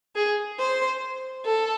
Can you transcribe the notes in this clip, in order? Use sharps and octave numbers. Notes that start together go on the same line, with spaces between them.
G#4
C5
A4